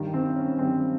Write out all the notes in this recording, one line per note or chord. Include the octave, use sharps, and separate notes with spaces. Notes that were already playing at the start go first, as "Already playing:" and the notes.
Already playing: G2 D#3 G3
C4
C#4
G2 D#3 G3 C4